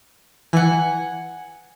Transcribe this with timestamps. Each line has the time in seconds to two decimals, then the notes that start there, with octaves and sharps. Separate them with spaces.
0.53 E3 F#5 G#5